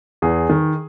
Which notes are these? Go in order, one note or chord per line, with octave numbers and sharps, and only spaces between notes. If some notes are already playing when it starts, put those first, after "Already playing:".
E2 G#4
D#3